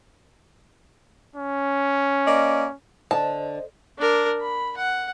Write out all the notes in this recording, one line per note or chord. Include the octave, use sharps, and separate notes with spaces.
C#4
A#3 D5 D#5
D3 C5 D#5 A5
D4 A#4
B5
F#5